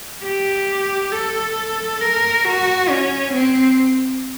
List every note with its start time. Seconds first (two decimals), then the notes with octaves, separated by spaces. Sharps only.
0.23 G4
1.12 A4
2.01 A#4
2.45 F#4
2.90 C#4
3.34 C4